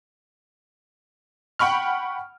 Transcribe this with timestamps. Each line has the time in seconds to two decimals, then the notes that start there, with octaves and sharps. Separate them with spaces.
1.59 F#5 G5 B5 C#6 F6